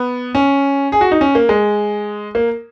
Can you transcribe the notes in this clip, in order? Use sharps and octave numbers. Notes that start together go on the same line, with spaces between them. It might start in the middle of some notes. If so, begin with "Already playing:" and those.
Already playing: B3
C#4
G#4
F#4
D#4
C#4
A#3
G#3
A#3